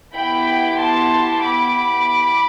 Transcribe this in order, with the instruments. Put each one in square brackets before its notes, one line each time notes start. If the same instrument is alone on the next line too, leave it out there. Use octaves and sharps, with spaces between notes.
[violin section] B3 E4 G4 G5 B5
A5 C6
B5 D6